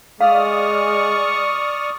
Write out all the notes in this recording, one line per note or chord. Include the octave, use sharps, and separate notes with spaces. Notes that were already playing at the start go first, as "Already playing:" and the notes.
G#3 D5 F5 C#6 D#6 F6